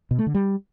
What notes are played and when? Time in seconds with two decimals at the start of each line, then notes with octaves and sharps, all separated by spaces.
0.11 B2
0.19 A3
0.27 D3
0.34 G3